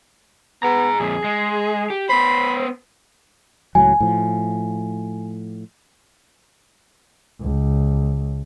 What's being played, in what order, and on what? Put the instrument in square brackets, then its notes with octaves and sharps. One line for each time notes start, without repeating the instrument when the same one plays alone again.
[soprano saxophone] B3 [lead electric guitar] G#4 A#5
[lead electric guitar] F2 A#2 [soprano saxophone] G#4
[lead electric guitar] G#3
G4
[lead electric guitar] B3 C5 [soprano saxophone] B5
[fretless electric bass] C#2 A2 F#3 [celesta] G#5
[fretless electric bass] A2 F3
[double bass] C#2